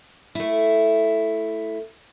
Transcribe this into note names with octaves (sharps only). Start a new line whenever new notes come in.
A3 E4